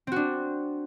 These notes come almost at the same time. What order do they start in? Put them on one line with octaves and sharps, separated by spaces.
C4 F#4 D4